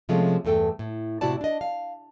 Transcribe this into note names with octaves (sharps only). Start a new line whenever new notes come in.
C3 F3 G#3 A3 C#4
E2 G2 A3 A4 G5
A2
A2 C3 E4 F#4 D5 A5
D4 D#5
F5